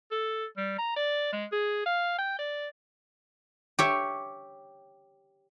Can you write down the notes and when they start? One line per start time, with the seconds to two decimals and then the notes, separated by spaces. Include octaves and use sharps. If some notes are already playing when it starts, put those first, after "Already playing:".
0.11 A4
0.57 G3
0.79 A#5
0.96 D5
1.33 G#3
1.52 G#4
1.86 F5
2.18 G5
2.39 D5
3.79 G4 C#5 E5